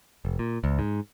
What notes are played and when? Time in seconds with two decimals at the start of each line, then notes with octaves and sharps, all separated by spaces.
0.25 F1
0.39 A#2
0.64 C#2
0.79 G#2